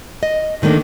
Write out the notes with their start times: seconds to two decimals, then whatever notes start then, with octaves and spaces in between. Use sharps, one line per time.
0.23 D#5
0.62 D3 D#3 A3 A#3 D4